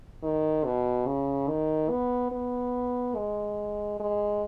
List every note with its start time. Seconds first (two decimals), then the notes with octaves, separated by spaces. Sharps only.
0.23 D#3
0.65 B2
1.07 C#3
1.49 D#3
1.90 B3
2.32 B3
3.16 G#3
4.00 G#3